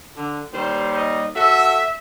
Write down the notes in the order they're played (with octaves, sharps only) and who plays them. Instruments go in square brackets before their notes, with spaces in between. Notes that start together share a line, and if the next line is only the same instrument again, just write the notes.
[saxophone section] D3
[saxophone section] D#2 G3 [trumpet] C5
[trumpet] D#5
[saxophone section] F#4 A4 [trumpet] E5